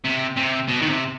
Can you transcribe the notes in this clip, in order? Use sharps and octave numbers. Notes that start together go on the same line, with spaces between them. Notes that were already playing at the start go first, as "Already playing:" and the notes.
C3
C3
B2
D#3
C3